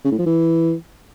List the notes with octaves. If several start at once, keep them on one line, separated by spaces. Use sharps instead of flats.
C#3
A2
F3
E3